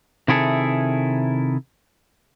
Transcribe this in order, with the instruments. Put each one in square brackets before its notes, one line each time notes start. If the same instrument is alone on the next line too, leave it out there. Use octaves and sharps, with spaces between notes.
[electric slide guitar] C3 D#3 E4 G#4 A4